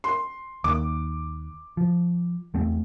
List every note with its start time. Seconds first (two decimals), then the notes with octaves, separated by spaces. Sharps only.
0.04 C6
0.64 D#2 D6
1.77 F3
2.54 E2 A3 C4